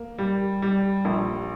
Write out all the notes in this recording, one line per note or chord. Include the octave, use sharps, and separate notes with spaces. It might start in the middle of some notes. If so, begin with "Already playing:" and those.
Already playing: A#3
G3
G3
A#1